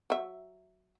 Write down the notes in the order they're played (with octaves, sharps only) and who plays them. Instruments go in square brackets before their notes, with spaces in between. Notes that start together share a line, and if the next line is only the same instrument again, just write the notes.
[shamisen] F#3 E5